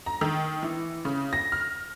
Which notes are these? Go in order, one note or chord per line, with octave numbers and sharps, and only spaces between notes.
A#5
D#3
E3
C#3
A#6
F6